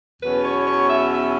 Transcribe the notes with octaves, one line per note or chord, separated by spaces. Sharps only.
E2 B2 F#3 C#4 B4
C#5
C#5
E5
E5